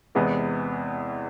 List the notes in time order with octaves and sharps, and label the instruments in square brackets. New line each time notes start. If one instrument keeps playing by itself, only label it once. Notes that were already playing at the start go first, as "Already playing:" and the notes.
[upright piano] E2 C3 E3 G#3 B3